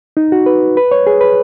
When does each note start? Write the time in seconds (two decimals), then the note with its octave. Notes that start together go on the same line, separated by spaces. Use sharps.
0.17 D#4
0.32 F#4
0.46 B4
0.77 B4
0.91 C#5
1.07 G#4
1.21 B4